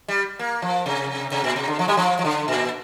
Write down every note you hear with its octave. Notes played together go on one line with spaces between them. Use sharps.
G3
A#3
F3
C3
C3
A#2
C3
D3
F3
G3
F3
F3
D3
A#2